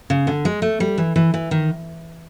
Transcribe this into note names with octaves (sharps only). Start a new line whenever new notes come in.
C#3
D3
G#3
A3
G3
E3
E3
E3
D#3